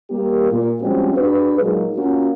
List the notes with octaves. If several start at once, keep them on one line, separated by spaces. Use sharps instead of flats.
G3 A#3 G4
A#2
F3 G3 G#3 C4 C#4 F#4
D4 F#4 G#4 B4
A#2 F#3 G#3 A#3 D#4 G#4
A#3 C#4 F4 F#4